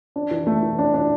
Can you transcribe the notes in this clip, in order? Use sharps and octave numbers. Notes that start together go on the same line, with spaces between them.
D4
E3
A3
E3
D4
D4